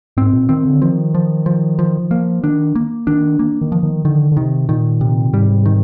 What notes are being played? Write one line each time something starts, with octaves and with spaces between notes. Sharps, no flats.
G#2 C4
A#2
D#3 C4
D3
D#3 F3
F3
F3
F3
F3 A#3
D#3 D4
A#3
D#3 D4
A#3
D#3
F3
D#3
D3 D#3
D3
C3 D#3
A#2 D#3
C3
G#2 G3
D#3